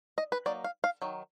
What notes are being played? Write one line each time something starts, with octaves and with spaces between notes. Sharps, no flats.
D#5
B4
F#3 A#3 D#4 D5
F5
F5
D#3 F#3